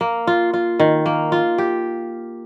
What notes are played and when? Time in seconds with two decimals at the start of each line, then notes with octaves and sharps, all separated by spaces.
0.01 A#3
0.27 F4
0.54 F4
0.80 D#3
1.06 A#3
1.32 F4
1.58 G4